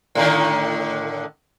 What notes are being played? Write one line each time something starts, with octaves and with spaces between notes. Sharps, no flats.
A2 D3 D#3